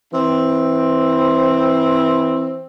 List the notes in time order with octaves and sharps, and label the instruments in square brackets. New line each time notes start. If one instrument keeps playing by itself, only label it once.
[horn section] E3 C4